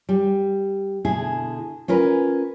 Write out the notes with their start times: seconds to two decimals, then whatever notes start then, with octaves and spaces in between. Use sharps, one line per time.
0.09 G3
1.05 B2 D3 E4 G#4
1.88 C#4 F4 A#4 B4